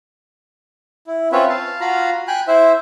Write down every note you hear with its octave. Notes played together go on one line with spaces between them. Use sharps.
E4
C4 C#4 F4 B4 C#5 E5
F5 A5
F4 F#4 F5 A#5 B5
G5 G#5 B5 F#6
E4 C5 E5